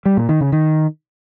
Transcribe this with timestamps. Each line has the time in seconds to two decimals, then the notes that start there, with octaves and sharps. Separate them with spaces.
0.05 G3
0.17 A#2
0.29 D#3
0.41 C#3
0.52 D#3